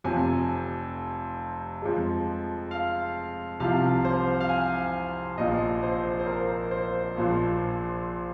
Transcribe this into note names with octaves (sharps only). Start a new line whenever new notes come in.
F1 F2 C3 F3 G#5
F2 F3 G#3
F5
C2 C3 F3 F5
C5
F5
G#5
A#1 A#2 F3 D#5
C5
C5
A#4
C5
A#1 A#2 F3